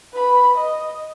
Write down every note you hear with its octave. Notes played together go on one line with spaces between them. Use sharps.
B4 B5
D#5